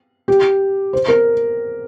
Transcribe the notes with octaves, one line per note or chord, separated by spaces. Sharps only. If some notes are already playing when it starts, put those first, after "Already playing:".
G4
C5
A#4